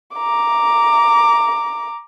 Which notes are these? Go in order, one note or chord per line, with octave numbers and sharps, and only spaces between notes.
A#5 D6